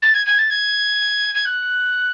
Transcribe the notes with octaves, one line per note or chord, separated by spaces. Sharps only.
A6
G#6
G#6
A6
G#6
G#6
F#6